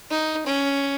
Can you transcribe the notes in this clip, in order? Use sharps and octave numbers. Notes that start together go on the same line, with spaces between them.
D#4
C#4